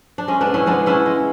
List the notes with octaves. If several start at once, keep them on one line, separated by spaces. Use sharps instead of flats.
D4
G#3 C#4
B3 D4
C#3
C#4 E4
G#3 B3 D4
C#3 C#4 E4
G#3